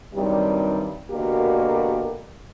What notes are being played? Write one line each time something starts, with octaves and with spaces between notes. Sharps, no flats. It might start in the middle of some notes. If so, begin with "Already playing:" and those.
G2 C3 D#3 F#3 G3
B2 D3 A#3 F#4 G4 A#4